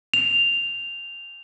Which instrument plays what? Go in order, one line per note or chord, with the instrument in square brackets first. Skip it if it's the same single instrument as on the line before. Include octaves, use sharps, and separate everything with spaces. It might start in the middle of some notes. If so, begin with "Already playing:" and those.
[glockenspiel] F7